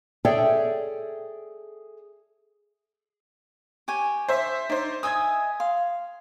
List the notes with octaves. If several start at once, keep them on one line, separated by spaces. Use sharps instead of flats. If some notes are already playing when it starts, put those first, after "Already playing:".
G#4 A4 C#5 D5 E5 G5
G4 C#5 G#5
C5 E5
D#4 C5 D5
D#5 E5 G#5 D#6 G#6
F5 C6